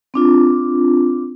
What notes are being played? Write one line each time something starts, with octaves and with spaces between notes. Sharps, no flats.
C4 D4 F4